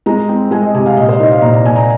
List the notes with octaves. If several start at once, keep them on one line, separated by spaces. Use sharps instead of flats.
G#3 A#5
C4
G#3 G#5
D#5
C3 G#5
F5
A#2 D#5
C5
D#4 D#5
F5
A#2 A#5
A#5
A#2 G#5
A#5